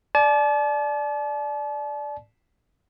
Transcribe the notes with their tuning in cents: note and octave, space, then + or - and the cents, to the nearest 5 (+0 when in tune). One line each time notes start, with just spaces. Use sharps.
D5 +0 A5 -40